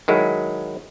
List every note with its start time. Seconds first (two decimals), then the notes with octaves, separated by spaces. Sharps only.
0.08 D#3 F#3 G#3 E4